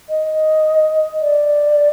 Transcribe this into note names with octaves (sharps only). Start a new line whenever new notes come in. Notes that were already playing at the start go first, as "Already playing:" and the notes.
D#5
D5